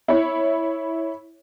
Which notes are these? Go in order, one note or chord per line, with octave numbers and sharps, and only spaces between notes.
E4 C#5